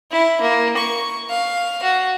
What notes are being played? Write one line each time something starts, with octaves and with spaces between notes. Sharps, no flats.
E4
A#3
C#6
F5
F#4